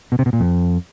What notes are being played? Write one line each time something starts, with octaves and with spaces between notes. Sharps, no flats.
B2
C3
B2
A#2
F2